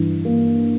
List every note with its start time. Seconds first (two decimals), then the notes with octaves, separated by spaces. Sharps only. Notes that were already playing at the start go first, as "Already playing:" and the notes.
Already playing: G2 E3
0.25 A#3